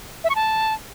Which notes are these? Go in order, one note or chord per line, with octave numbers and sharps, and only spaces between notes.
E5
C#6
A5